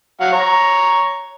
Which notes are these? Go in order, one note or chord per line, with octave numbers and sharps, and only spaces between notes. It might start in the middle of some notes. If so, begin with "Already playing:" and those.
F#3 F5 F#5
C#5 A#5